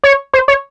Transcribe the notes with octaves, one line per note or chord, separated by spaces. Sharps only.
C#5
C5
C#5